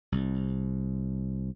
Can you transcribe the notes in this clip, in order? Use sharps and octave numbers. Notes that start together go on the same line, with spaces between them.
C2